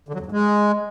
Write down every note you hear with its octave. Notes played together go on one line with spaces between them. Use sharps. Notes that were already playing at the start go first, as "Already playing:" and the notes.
D3
F#3
E2
G#2
G#3